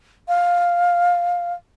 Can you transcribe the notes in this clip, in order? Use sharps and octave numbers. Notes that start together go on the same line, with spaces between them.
F5